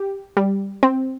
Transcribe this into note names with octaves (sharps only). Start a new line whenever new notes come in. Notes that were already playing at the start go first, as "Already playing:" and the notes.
Already playing: G4
G3
C4